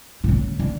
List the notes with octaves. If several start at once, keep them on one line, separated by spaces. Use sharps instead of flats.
B2
C#3
D3